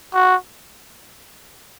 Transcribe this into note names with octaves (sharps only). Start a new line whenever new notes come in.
F#4